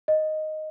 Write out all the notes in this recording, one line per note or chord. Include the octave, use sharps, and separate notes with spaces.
D#5